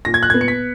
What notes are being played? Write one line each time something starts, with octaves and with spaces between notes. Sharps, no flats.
A#2 A#6
G#6
F#6
B3 G#6
C#7
B6